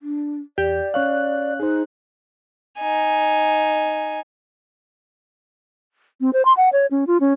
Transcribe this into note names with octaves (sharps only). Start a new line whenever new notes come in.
D4
E2 G4 D5
C#4 C#5 F5 F#6
D#4 G#4 C5
D#4 G#5
C4
C5
C6
F#5
C#5
C#4
F4
C#4